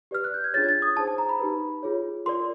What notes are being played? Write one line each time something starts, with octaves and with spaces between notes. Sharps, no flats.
G4 B4 D5 F6
F#6
G6
G#6
D4 F4 G#4 C#5 A6
G#6
A6
D#6
D#4 G#4 C5 A5
A5
A#5
B5
D#4 G4 B4
F4 G#4 C#5
F4 A#4 D5 C6